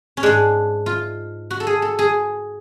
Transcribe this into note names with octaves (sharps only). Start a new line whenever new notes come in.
C#4
G#2 G#3 D4
F4
F#4
A4
G#4
A4
G#4